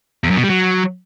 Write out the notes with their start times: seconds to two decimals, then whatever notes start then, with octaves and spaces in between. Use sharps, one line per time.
0.24 E2
0.30 F#2
0.37 B2
0.43 G3
0.50 F#3